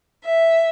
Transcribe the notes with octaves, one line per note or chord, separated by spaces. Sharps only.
E5